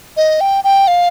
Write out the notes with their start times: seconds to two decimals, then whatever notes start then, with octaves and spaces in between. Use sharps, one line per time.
0.17 D#5
0.41 G5
0.64 G5
0.88 F5